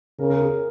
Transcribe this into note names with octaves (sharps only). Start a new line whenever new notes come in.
C#3 A#4
A#4
G#4